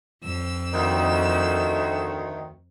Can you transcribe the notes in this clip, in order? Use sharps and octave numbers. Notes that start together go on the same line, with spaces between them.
F2 E6
D2 D#3